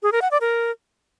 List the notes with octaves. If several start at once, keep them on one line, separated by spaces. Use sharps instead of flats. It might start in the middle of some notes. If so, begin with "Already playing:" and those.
G#4
A#4
F#5
D5
A#4